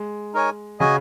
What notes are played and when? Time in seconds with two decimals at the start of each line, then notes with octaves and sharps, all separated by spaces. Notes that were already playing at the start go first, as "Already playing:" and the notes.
Already playing: G#3
0.34 D#4 A#4 C#5 G#5
0.80 C#3 F#4 D#5 G#5